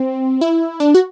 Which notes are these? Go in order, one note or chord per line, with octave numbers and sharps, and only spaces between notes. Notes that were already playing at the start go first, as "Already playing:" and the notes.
Already playing: C4
E4
D4
F#4